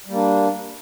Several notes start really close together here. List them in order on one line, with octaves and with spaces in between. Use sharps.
G3 A#3 D4